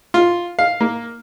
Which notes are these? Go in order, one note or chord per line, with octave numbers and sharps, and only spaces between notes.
F4
F5
A#3